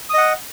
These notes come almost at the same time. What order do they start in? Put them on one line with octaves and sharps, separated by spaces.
D#6 D#5 F#5